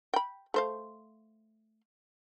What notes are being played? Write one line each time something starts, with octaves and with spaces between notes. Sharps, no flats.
G5 B5
A3 C5 F5